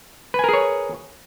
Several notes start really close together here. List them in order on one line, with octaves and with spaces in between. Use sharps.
B4 G#5 A#4 G#4 C#5